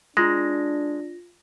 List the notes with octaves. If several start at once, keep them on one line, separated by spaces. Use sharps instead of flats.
G#3 D4 F4 A#6